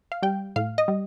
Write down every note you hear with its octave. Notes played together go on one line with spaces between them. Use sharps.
F5
G3 G5
A2 F5
D#5
G3